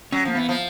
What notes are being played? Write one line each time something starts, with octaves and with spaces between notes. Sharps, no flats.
F#3 C#4
F3 A#3
E3 B3
F3